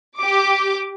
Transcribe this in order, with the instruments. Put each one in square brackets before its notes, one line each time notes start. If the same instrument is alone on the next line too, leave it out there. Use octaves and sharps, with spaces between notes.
[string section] G4 D6